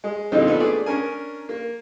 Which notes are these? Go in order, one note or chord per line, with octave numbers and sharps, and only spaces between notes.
G#3
A#2 D3 E3 G3 C4 D#4
B3 D4 F4 A4 B4
A3 G#4 D5
C#4 D4 A#4 G#5
A#3